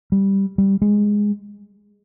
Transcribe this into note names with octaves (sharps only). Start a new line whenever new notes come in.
G3
G3
G#3